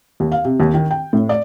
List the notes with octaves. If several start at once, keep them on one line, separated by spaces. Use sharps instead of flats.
D#2
F5
C3
D#2
D#3
G5
A2
D5